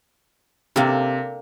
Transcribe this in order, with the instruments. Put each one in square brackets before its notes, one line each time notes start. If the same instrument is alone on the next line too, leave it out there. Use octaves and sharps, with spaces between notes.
[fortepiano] C3 [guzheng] A#3 D4 A4